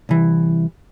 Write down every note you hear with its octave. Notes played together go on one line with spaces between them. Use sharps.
C2 E3